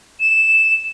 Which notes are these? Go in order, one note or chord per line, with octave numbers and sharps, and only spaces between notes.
E7